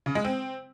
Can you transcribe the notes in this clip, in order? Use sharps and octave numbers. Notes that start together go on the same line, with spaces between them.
C#3
G#3
C4